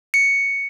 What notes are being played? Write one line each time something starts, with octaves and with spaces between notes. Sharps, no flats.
C#7